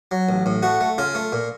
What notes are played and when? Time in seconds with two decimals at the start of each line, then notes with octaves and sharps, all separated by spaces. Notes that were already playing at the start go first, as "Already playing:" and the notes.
0.11 F#3
0.29 A1
0.46 A2
0.63 A3 F#4
0.81 A3
0.98 C#3 F4
1.15 A3
1.32 A#2